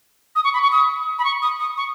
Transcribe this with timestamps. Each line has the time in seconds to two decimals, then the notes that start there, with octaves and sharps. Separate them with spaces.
0.35 D#6
0.44 C#6
0.53 B5
0.62 C#6
0.71 D#6
1.18 B5
1.24 C#6
1.42 D#6
1.59 D#6
1.77 C#6